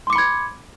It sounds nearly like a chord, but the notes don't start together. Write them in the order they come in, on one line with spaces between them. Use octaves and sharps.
C6 D6 C#7 B5 G#6